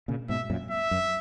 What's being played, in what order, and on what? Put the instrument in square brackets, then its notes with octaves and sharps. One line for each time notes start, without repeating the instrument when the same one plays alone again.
[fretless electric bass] A#2 C#3
[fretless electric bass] G#2 B2 [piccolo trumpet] E5
[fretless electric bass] F#2 A#2
[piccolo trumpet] E5
[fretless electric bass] F#2